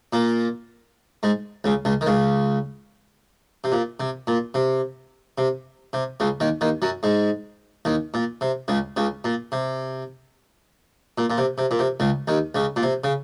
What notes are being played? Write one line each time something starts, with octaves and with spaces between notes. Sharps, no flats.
A#2 A#3
G#2 G#3
C#2 C#3
C#2 C#3
D#3
C#2 C#3
C3
A#2
C3
A#2
C3
C3
C3
C#2 C#3
D#2 D#3
D#2 D#3
F#2 F#3
G#2 G#3
D#2 D#3
A#2
C3
C#2 C#3
C#2 C#3
A#2
C3
A#2
A#2
C3
C3
A#2
C3
C#2 C#3
D#2 D#3
C#2 C#3
A#2
C3
C#3